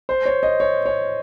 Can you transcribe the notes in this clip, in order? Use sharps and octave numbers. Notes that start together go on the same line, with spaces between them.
C5
C#5
D#5
C#5
C#5